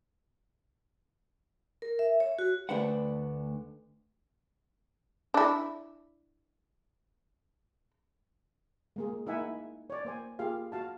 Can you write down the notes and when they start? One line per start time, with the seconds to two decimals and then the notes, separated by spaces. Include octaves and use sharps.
1.82 A#4
1.99 E5
2.20 C#5
2.39 F#4
2.69 D2 A3 D4 B4 C5 F#5
5.34 D4 E4
8.96 G#3 A#3 G#4
9.26 A#3 D#4 E4 E5 F#5 G#5
9.90 C#5 D5
10.05 A#3 C5 G#5
10.39 A#3 F4 G4 G#4 F5
10.72 F#4 F5 A5